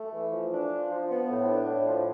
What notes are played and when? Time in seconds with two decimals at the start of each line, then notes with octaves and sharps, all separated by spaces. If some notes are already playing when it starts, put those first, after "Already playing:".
Already playing: A3
0.13 E3
0.32 F3
0.52 D4
0.70 F3
0.90 F3
1.09 B3
1.29 A2
1.48 D4
1.68 A2
1.87 F3